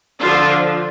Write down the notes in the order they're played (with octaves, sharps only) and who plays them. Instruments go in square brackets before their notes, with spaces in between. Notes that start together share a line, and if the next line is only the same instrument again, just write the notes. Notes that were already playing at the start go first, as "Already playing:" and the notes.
[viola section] D3 F3 D4 F4